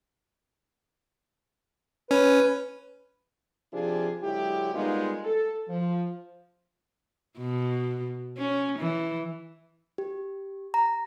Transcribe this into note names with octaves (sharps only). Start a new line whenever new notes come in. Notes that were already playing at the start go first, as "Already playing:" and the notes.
C#4 B4
C3 F3 D4 F4 G4 G#4
D3 F#3 G#3 E4 G4
G3 G#3 A#3 B3 D#4 F4
A4
F3
B2
C#4
E3
G4
A#5